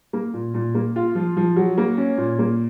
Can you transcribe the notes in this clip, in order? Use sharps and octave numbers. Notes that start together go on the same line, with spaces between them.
A#3
A#2
A#2
A#3
F4
F3
F3
F#3
A#3
C#4
A#2
A#3